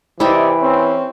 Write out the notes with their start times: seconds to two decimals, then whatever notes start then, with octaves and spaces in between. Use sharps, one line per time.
0.20 C3 E3 E4 G4 D5 D#5
0.61 C4 C#4